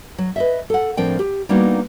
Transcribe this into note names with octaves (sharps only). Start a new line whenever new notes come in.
F#3
B4 D#5 E5
A4 F#5
A2 F3 C4 D4 A#4 G5
G4
G3 A#3 B3 D4 D#4 F#4